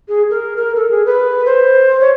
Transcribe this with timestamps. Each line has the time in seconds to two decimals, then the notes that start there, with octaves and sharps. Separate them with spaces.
0.09 G#4
0.30 A#4
0.57 A#4
0.76 A4
0.91 G#4
1.06 B4
1.46 C5
2.01 C#5